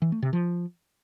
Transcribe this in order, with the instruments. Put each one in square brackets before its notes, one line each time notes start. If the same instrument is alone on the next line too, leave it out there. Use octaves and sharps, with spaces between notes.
[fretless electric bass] E3
A3
C3
F3